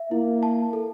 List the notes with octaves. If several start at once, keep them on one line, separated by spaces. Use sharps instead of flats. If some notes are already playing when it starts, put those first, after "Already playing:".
Already playing: E5
A#3 E4
A5
A4